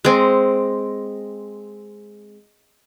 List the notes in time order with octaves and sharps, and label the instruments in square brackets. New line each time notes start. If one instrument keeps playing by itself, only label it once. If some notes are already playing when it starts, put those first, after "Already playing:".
[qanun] G#3 C4